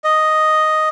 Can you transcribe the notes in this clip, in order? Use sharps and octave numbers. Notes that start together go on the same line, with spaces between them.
D#5